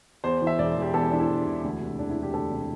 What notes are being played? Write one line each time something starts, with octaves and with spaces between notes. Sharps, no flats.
E2 C5
E3
E5
E1 D5
E1
G4
E2 A4
E4
E3 D4
E4
E1
E1
D2
C3
E1 D4
E4
E3
G4
D2 A4
C3